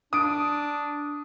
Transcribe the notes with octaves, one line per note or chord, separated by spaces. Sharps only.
D4 D#6 D7